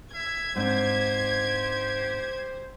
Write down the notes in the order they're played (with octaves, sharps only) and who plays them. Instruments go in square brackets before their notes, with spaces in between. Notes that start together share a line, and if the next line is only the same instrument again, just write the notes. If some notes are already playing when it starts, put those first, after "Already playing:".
[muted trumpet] E5 [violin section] G#6
[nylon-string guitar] G#2 C4 D4 [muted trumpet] G4 [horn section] C5